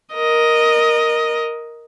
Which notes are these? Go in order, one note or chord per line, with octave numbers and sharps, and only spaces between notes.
A#4 D#5